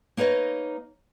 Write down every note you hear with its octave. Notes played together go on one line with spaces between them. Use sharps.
A#3 D#4 B4 C#5 D#5